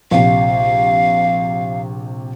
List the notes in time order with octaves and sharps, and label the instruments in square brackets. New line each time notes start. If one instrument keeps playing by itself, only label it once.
[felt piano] A#1 C3 [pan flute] F5